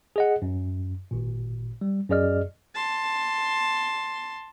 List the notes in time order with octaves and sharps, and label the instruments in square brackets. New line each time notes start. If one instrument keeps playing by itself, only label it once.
[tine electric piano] G#4 D#5 F#5
F#2
G#1 A#2
G3
F#2 G#4 D5 D#5 F6
[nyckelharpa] A5 C6